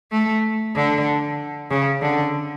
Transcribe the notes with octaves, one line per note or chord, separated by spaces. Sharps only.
A3
D3
C#3
D3